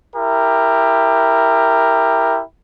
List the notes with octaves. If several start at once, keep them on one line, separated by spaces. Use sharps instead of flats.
E4 G4 A#4